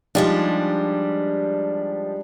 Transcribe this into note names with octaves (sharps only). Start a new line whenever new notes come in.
F3 G3 G#3 D4 D#4 G4